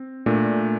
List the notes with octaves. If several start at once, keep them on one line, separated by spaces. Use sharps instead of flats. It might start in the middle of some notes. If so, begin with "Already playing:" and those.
Already playing: C4
A#2 A3 D4